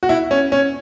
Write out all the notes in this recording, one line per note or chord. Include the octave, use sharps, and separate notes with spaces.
F#4
E4
C#4
C#4